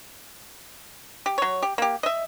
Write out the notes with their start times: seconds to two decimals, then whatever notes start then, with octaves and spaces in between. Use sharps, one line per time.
1.26 G4
1.38 F#3 C#5
1.62 G4
1.78 A#3 G4
2.03 D#5 E5